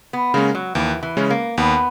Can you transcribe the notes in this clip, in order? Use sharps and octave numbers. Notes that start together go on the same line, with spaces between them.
B3
C#3 G#3 A#3 C#4
F#3
D#2 E3
E3
C#3 G#3 C#4
A#3
D#2 B3